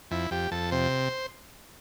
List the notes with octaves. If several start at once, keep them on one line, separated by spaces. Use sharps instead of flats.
F2 E4
F2 G4
F2 A4
C3 C5